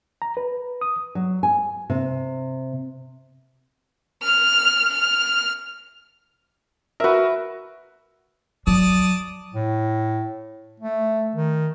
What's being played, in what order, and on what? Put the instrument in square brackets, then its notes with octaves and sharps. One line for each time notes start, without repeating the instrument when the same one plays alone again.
[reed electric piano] A#5
B4
D#6
[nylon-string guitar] F#3
G#5
C3
[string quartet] F6
F6
[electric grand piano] F#4 A#4 [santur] B4 E5
[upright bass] F#3 [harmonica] D5 A5 D#6
[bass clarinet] A2
A3
D#3